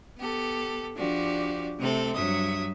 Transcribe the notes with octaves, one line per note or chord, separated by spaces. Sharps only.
B3 G4 A4
F3 D4 F#4 G4 D5
C3 A3 C4 A4
G2 F#3 E5 D#6